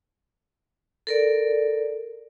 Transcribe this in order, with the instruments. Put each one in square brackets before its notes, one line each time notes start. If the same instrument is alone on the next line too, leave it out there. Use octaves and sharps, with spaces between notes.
[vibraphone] A4 A#4 D5